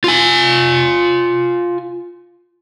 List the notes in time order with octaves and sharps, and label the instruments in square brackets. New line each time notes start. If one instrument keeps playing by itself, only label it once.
[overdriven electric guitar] F4 G#5